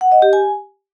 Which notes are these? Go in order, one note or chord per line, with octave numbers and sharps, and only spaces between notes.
F#5
D#5
G4
G#5